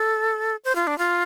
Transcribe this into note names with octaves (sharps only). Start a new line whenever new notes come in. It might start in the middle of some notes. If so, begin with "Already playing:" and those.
Already playing: A4
C5
F4
D4
F4